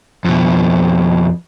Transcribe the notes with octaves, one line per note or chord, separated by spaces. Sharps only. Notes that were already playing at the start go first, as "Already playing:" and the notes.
F2 B2